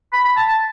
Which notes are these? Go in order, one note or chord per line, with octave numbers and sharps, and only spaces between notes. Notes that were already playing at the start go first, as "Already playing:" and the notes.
B5
B5
A5
A5